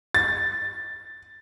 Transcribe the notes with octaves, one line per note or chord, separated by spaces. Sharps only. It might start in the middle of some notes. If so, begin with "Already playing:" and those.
A6